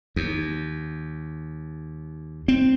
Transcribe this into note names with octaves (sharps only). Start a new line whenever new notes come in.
D#2
C4